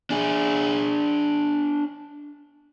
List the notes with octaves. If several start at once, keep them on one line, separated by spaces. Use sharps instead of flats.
D4 G#4